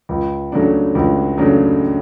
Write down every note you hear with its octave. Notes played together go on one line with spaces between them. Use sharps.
C#2
C#3 F#3 A3 D4
C#2
C#3 F#3 A3 D4